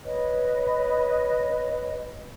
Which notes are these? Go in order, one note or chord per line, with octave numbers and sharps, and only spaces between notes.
B4 C#5 D#5